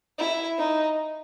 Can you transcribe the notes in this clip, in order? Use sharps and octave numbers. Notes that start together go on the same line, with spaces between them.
E4
D#4